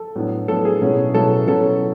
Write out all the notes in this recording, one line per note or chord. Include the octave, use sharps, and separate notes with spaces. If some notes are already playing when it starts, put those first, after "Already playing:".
Already playing: A4
A2 F#3 B3 D4
A2 F#3 B3 D4 A4
G#4
B2 F#3 C#4 E4
B2 F#3 C#4 E4 A4
B2 F#3 C#4 E4 A4